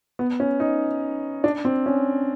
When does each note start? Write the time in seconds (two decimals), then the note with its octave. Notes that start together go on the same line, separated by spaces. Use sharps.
0.19 B3
0.40 C#4
0.60 D#4
1.44 D4
1.65 C4
1.86 C#4